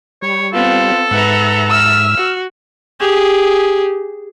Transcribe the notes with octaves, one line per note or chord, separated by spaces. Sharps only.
G3 C#5
B3 C4 F4 A4
G#2 B4 E5 F#5 A#5
E6 F6
F#4
G4 G#4